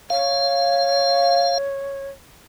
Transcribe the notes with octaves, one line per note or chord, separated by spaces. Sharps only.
C#5 F5